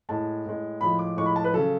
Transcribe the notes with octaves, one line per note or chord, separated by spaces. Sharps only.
A2 G#3 A5
A2 G#3
A2 F3 G#3 B5
D6
A2 F3 G#3 C#6
B5
A5
B4
C#3 F#3 A4